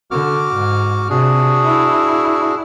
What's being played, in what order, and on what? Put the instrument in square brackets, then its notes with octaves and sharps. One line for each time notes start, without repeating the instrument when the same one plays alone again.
[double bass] D3 [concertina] F#4 D6 F6
[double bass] G#2
[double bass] C3 [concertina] D4 F#4 G#4
[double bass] E4